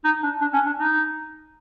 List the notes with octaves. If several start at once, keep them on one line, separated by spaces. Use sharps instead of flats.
D#4
D4
D4
C#4
D4
D#4